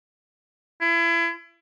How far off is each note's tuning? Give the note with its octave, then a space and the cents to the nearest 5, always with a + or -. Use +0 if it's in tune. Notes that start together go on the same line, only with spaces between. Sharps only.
E4 +35